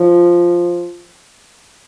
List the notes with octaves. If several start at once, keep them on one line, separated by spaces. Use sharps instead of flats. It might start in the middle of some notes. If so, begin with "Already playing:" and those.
Already playing: F3